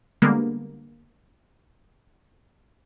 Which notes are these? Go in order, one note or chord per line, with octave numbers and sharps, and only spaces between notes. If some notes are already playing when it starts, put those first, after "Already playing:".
D3 G3 G#3 A#3 B3